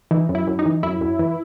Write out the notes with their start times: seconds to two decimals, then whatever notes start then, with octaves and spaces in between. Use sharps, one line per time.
0.11 E3 D#4
0.29 F#2
0.35 E4
0.47 F#2
0.59 D#4
0.65 E3
0.83 F#2 E4
1.01 F#2
1.19 E3